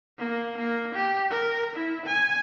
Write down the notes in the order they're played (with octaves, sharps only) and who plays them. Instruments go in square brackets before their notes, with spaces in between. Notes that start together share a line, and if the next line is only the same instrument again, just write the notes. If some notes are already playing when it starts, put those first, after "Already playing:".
[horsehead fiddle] A#3
A#3
G4
A#4
E4
G#5